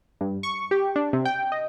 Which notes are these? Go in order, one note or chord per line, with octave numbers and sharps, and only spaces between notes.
G2
C#6
G4
D4
C3
G5
D#5